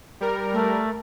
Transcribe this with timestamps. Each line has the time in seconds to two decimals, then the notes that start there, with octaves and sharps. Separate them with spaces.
0.21 G3 A#4
0.53 A3